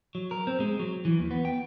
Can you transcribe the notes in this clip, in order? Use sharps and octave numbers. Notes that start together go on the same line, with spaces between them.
F#3
A#4
C4
G#3
F#3
E3
D#2
B3
G5